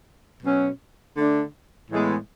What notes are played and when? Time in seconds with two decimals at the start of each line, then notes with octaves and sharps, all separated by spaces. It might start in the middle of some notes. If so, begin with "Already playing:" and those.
0.43 B2 F#3 C#4
1.17 D3 A3 D4
1.90 A2 E3 G#3 B3